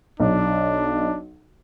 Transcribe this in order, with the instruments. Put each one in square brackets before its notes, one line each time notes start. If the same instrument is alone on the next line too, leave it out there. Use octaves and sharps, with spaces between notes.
[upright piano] B1 [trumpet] D4